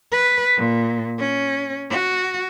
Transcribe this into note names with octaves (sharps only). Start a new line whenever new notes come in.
B4
A#2
C#4
F#4